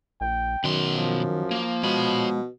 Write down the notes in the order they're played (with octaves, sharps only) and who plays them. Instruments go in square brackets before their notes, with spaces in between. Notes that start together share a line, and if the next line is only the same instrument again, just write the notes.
[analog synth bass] A#1 [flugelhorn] G5
[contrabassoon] F#2 [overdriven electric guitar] B2 C6 [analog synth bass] D#3
[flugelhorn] F3
[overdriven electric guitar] A#3
[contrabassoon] B2 [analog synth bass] G#3 [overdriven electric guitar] C#5 B5